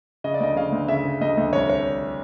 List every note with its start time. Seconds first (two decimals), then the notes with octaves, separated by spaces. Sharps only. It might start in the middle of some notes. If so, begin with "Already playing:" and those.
0.24 C#3 D#5
0.34 D5
0.40 D2 D#5
0.56 C#3 F5
0.72 D2
0.88 C#3 E5
1.05 C#3
1.21 D2 D#5
1.37 D2
1.53 C2 C#5
1.69 C#5